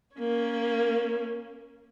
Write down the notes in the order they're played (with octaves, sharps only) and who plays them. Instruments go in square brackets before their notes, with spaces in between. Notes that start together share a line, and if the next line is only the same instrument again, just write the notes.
[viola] A#3 C#4